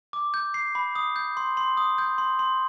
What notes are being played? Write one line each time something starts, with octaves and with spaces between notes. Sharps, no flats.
D6
G6
C7
B5
D#6
G6
C6
C6
D#6
G6
C6
C6